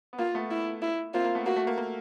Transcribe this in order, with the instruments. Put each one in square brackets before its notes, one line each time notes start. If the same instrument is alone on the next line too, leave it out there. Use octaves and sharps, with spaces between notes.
[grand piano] B3
[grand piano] A#3 [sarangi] F4
[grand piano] A3 B3
[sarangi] E4
E4
[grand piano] A#3 C4 [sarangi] F4
[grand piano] A#3
A3 B3
[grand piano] A#3 [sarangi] F#4
[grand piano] A3
A#3
A#3